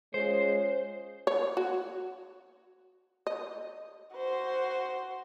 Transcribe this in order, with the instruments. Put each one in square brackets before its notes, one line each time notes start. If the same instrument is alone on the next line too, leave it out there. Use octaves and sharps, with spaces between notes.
[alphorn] G#3 [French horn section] C#4 F4 C#5 [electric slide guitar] C5
[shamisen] C#5
F#4
D#5
[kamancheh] F#4 C5